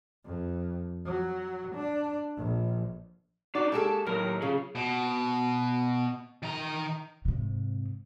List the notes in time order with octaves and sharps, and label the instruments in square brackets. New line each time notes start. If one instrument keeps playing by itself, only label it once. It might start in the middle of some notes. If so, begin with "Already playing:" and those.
[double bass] F2
F#3
D4
A#1
[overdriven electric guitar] D4 D#4 [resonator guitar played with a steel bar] F#4 [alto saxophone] D5
[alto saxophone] G#3 [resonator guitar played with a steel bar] A#3 G4 A4 [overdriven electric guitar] A5
[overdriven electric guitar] D#2 [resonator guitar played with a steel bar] A2 [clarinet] F#3 [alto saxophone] A#4
[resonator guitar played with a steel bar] C#3 [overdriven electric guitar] C#4 G#4 [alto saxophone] F4
[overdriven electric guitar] B2
D#3 A#5
[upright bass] G#2 C3